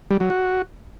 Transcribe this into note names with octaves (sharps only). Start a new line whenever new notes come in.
G3
F#3
F#4